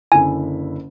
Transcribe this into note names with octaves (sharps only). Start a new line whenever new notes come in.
F#1 D3 E4 G#5